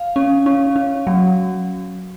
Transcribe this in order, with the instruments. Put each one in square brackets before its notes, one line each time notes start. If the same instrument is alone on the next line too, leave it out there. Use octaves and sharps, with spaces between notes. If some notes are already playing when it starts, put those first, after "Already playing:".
Already playing: [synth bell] F5
C#4
C#4
C#4
F#3